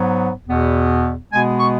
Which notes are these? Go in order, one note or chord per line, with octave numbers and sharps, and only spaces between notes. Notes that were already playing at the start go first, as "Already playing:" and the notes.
Already playing: G#2 F#3 B3
E2 B2 B3
B2 G#3 B3 G#5
C#6